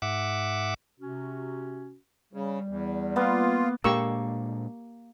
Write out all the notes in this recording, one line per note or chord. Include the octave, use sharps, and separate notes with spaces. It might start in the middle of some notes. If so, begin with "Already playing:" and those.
G#2 E5 F#5 D6
C3 C#4 F#4
C#3 G3
E2
A#3 B3 F4
A#2 G#3 A#3 D4 G4 C#6 E6